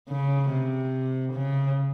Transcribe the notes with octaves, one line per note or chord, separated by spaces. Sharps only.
C#3
C3
C#3